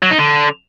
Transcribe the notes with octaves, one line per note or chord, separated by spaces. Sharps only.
F#3
D#4
D3